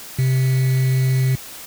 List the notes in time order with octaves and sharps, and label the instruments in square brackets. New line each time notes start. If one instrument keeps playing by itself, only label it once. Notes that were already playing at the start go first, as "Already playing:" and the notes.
[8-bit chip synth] C3